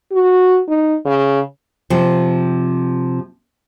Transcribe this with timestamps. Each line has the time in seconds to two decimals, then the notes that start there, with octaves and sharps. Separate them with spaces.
0.12 F#4
0.68 D#4
1.05 C#3
1.90 C3 F3